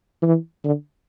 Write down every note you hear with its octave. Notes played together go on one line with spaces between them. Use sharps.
E3
D3